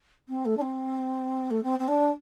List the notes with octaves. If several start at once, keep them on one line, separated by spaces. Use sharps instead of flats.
C4
A3
D4
C4
A3
C4
C4
D4